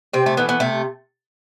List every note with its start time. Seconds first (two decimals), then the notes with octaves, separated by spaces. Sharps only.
0.13 C3 C4
0.26 A3
0.37 E3 A3 B3
0.49 B3
0.60 C3 A3